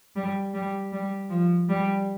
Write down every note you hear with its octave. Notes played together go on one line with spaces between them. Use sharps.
G3
G3
G3
F3
G3